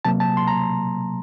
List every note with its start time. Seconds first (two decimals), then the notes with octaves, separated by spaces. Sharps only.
0.05 C3 F#3 A#3 A5
0.20 A5
0.37 C6
0.48 A#5